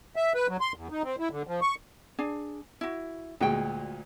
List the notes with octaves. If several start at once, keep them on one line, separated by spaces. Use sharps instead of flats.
E5
B4
F#3
C6
E2
D#4
C4
E4
D3
F3
C#6
D4 G#4 G#5
E4 F#4
D2 A#2 G#3 F#4 G5